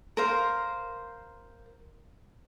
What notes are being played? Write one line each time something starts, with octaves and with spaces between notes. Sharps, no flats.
A#4 C5 F5